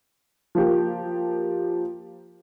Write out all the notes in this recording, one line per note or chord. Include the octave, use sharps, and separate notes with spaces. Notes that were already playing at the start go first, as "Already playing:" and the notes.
F3 A#3 G4